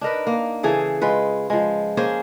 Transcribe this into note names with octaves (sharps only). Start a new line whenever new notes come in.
D4 D#4 A#4 B4
A#3
C#3 E3 G#4 A4
G#3 F4 B4
F3 G#3
A#3 C#4 G#4 C5